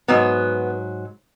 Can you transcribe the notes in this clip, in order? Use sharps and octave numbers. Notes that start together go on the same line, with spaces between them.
G#2 F#3 B3